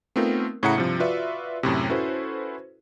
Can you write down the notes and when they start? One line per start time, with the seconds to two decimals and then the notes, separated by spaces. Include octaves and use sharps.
0.16 A3 B3 C4 D#4 F4 A#4
0.63 A2 C#3 E4 F#5 A#5 C#7
0.76 G2 C3 F3
1.00 F4 F#4 B4 D5 E5
1.63 F#2 A2 C3
1.89 C#4 E4 F#4 A4 B4 C5